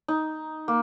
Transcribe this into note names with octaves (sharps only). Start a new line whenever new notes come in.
D#4
A#3